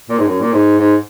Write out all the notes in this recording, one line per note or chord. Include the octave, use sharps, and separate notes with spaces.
A#2
G#2
F#2
A#2
G#2
G#2